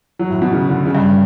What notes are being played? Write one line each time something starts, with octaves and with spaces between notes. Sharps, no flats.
F#3
A2
B2
C#3
D3
C#3
G2